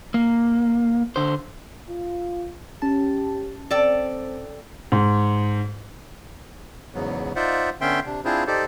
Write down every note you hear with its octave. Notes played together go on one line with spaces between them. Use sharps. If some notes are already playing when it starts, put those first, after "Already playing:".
A#3
D3 C5
F4
C#4 G4 A5
C4 A4 D5 G5
G#2
E2 G#2 C#3 F#3 B3
D#4 F4 C5 D5 E5 F#5
D3 B3 C#4 E5 G5 C6
C3 D4
C4 D4 E4 F4 G#4 C5
D#4 G4 A4 C5 D5